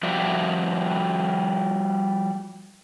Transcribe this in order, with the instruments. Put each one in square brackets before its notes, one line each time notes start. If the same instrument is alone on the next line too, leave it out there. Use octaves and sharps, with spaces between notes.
[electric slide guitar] F3 G3 F#4 G4 D5 E5